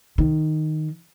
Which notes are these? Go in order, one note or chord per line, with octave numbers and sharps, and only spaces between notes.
D#3